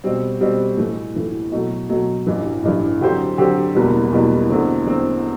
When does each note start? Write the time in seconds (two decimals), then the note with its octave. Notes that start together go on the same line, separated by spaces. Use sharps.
0.04 B2 G3 C4
0.41 B2 G3 C4
0.77 A2 E3 A3
1.15 A2 E3 A3
1.52 B2 F#3 A3
1.89 B2 F#3 A3
2.27 A1 G2 E3
2.63 A1 G2 E3
3.01 D3 F#3 C4 G4 C5
3.38 D3 F#3 C4 G4 C5
3.75 F#1 E2 B2 G3
4.12 F#1 E2 B2 G3
4.49 E2 D3 A3 C4
4.87 E2 D3 A3 C4